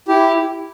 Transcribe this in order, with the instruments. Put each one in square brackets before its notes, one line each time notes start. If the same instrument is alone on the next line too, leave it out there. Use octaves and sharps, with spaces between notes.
[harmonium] E4 [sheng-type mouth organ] G4